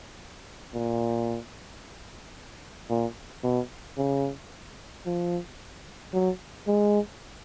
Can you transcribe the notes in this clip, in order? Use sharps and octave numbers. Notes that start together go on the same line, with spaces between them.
A#2
A#2
B2
C#3
F3
F#3
G#3